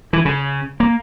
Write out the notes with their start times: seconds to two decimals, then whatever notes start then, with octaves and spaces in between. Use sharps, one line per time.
0.13 E3
0.25 C#3
0.80 A#3